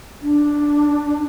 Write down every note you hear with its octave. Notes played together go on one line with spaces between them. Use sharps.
D4